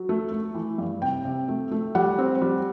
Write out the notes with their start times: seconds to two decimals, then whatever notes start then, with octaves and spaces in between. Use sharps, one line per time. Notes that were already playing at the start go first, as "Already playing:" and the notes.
Already playing: F#3
0.09 A3
0.32 A3
0.55 E3
0.78 G2
1.02 C3 G5
1.25 C3
1.48 A3
1.71 A3
1.95 G3 F#5
2.18 C4
2.42 G3